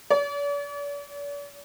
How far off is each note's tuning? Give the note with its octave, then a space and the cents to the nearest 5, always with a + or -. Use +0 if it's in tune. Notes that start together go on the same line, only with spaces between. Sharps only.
D5 -45